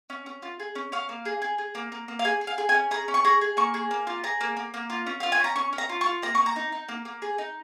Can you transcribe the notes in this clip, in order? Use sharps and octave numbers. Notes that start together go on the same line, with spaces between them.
C#4
C#4
F4
G#4
C#4
C#4 F5
A#3
G#4
G#4
G#4
A#3
A#3
A#3
F5
G#4 G#5
G#4
F5
G#4
G#5
C#4
G#4 A#5
C#4
C#6
G#4 A#5
G#4
A#3 C#6
G#4
A#3
F4
G#4 A#5
A#3
A#3
A#3
F4
C#4
F4 F5
G#5
C#4 A#5
C#4 C#6
C#4
A#5
F4
C#6
F4
A#3 A#5
A#3 C#6
A#5
D#4
D#4
A#3
A#3
G#4
D#4